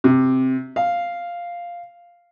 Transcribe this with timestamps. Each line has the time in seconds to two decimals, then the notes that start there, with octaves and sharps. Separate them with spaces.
0.04 C3
0.76 F5